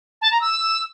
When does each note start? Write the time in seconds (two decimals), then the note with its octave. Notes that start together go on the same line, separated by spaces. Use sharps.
0.21 A5
0.31 A#5
0.41 E6